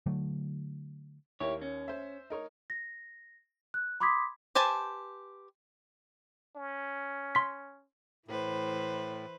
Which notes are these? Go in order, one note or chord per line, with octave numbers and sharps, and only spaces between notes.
D3 F#3 A3
D#2 A#3 E4 G4 C#5
C#4
C5 E5
D#4 A#4 C#5
A#6
F#6
B5 C6 D6 D#6 G#6 B6
G4 B4 C5 G#5 A5
C#4
C6 B6
A2 E3 B4 C5